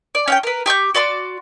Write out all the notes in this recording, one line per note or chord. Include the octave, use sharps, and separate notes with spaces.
D5
C#4 F#5 G5
A#4 B4
G4 C#6 D6 G6
F#4 D5 C6 D6